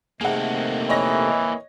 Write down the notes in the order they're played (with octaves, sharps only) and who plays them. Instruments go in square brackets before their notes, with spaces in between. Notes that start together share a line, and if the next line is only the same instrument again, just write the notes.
[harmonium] C3 D#3 A3 [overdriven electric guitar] A#3 C4 [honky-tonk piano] G#4 F#5
[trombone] E3 [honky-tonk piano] C#5 D#5 A#6